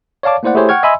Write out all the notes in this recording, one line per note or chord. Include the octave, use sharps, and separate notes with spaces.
C#5 D5 F5 A5 D6
A3 A#3 E4 C5 D5 F#5
A3 E4 G4 G#4 C5 C#5
F#5 G5 C#6 F6 G#6
D#5 E5 G#5 B5 C6 E6